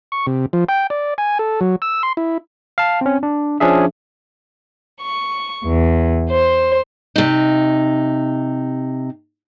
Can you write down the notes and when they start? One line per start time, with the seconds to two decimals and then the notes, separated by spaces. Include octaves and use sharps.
0.12 C#6
0.27 C3
0.53 F3
0.69 G5
0.90 D5
1.18 G#5
1.39 A4
1.61 F#3
1.82 E6
2.03 C6
2.17 E4
2.78 F5 A5
3.01 C4 C#4
3.23 D4
3.60 F3 C#4 D4 G#4 E5
5.00 C#6
5.65 E2
6.29 C5
7.16 C3 D#4